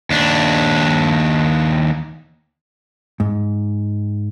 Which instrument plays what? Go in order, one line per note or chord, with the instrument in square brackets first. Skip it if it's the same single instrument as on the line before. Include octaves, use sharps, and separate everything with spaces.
[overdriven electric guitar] D#2 D4
[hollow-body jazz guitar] G#2